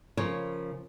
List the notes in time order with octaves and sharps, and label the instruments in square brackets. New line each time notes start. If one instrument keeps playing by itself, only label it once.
[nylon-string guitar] C#3 F3 A#4 C#5